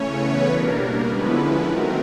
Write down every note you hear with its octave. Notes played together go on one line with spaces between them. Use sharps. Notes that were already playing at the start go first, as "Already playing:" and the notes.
Already playing: C#3 E3 A3 C#4 C#5
B3 B4
B2 G3 A#3 D4 A#4
D3 F3 G#3 B3 C#4 E4 B4
D#3 F#3 A3 C4 A#4